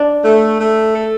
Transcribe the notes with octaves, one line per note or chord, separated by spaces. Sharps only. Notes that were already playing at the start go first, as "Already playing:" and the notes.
Already playing: D4
A3
A3
A4